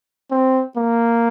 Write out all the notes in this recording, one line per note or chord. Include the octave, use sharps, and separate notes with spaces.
C4
A#3